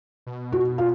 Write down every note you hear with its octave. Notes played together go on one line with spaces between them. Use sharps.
B2
F#4
F4